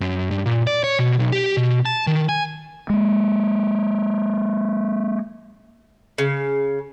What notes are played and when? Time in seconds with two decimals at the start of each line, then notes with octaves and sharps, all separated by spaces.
0.01 F#2
0.31 G2
0.46 A#2
0.67 D5
0.84 C#5
0.99 B2
1.19 B1
1.32 G4
1.57 B2
1.86 A5
2.07 D#3
2.29 G#5
2.90 G#3 A#3
6.18 C#3